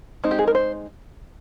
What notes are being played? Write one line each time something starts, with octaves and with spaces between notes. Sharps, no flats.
G#3 C4 D#4
G4
G#4
A#4
C5